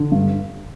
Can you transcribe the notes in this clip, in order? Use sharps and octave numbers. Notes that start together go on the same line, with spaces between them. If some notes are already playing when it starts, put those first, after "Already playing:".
Already playing: D3
G2